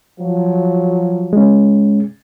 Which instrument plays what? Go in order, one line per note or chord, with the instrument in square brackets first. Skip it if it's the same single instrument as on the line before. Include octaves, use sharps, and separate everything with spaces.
[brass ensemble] F3 F#3
[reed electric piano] G#3 C#4